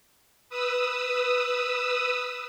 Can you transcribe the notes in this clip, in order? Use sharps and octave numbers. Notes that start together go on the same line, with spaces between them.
B4 D#6 E6